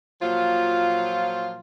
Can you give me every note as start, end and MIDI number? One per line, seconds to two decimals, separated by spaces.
0.22 1.59 46
0.22 1.59 53
0.22 1.59 54
0.22 1.59 65